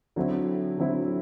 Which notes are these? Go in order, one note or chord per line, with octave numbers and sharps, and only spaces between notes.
D3 F#3 C4 E4
D3 F#3 C4 E4